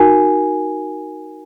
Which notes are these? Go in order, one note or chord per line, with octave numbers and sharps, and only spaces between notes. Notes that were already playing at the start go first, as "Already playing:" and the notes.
Already playing: D#4 F#4 A#4 G#5